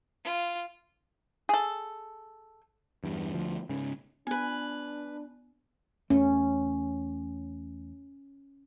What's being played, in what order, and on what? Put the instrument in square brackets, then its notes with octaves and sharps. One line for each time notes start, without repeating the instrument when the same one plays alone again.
[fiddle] F4
[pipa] G#4 A4
[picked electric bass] E2 G2
D2 F3
G#2 C#3
[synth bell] B3 [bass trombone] D4 [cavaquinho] B4 G#5
[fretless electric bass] E2 A3 [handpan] C#4